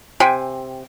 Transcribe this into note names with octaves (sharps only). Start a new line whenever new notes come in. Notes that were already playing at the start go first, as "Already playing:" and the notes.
C3 G5 G#5